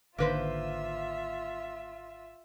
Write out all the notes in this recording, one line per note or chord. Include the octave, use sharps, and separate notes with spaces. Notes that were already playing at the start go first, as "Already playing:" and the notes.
G#1 D3 D#3 A#3 F4 B4 C5 E5